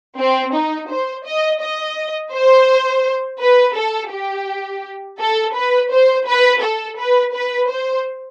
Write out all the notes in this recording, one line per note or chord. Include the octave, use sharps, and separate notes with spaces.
C4
D#4
C5
D#5
D#5
C5
B4
A4
G4
A4
B4
C5
B4
A4
B4
B4
C5